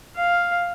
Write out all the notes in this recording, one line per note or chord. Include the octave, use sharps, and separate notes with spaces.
F5